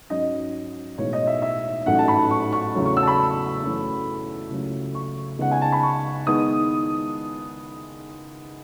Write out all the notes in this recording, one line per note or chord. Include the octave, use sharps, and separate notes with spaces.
G#2 F#3 C#4 D#5
B1 A2 E3 G#3 B3 C#5
D#5
E5
E5
A1 G#2 F#3 A3 C#4 F#5
A5
B5
C#6
C#6
E2 C#3 F#3 A3
C#6
E6
A5
B5
F#2 E3 A3 C#4
C#2 C#3 F#3 A3
C#6
C#2 C#3 G#3 B3 D#4 F#5
G#5
A5
B5
C#6
D#3 G#3 B3 E4 D#6